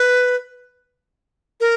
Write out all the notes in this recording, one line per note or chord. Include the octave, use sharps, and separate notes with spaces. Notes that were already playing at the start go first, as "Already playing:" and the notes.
Already playing: B4
A#4